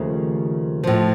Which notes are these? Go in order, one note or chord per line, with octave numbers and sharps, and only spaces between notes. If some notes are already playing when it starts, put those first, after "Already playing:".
Already playing: D#2 C#3 F3 A3
A2 F3